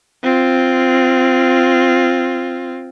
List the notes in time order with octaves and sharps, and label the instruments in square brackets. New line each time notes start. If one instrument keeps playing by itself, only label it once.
[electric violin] C4 F4